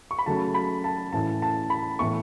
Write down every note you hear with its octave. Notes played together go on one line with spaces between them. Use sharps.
C#6
B5
C#3 F#3 A3 C#4 A5
B5
A5
A2 E3 C#4 A5
A5
B5
A2 E3 B3 C#6